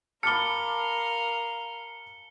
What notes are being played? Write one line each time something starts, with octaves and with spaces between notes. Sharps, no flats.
A#4 F5 A5 B5 D6 F6 C#7 G7